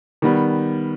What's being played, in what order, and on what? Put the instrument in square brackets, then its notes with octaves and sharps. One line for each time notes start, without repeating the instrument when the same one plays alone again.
[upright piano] D#3 G3 B3